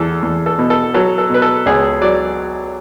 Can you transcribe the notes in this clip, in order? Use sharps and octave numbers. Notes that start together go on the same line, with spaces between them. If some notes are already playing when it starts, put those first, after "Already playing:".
Already playing: E2 A4
E2
A4
B2
A4
F#3 A4
A4
B2 B4
A4
C#2 G#4
F#3 D5